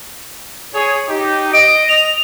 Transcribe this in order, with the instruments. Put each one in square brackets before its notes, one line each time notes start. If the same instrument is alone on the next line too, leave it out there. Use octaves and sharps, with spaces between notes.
[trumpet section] G#4 C#5
D#4 G4
[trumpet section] D#5 [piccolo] D7
[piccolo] F7